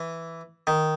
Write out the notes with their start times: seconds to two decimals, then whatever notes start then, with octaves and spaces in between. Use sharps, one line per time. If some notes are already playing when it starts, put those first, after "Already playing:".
Already playing: E3
0.67 D#3